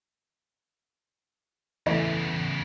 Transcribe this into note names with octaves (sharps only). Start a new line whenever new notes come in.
E2 C#3 E3 A3 E5